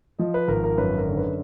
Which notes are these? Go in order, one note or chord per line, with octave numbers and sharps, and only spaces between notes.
F3 D#5
B4
G#1 A#4
A#4
F#2 B4
A#4
D3
B4